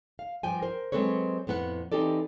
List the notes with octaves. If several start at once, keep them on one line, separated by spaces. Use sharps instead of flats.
F5
G2 F3 G5 G#5
A#4 C5
F#3 G#3 C4 A4 B4 C#5
F2 A2 B3 A4 F#5
E3 C4 D#4 G4 A4 D5